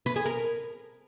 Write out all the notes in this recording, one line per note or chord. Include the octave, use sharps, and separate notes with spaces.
B4
G#4
A#4